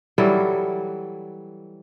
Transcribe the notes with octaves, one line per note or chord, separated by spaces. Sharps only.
E3 F#3 G3 A4